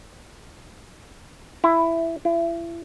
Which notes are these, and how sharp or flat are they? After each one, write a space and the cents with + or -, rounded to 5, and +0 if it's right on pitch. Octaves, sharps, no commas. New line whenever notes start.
E4 +10
E4 +35